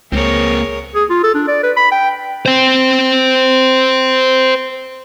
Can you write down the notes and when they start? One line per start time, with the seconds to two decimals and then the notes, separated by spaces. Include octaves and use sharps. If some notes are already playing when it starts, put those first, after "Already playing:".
0.12 C#2 A#3 C4 G#4 A#4 C#5
0.95 G#4
1.10 F4
1.23 A4
1.34 D4
1.48 D5
1.63 B4
1.77 B5
1.92 G5
2.46 C5 G5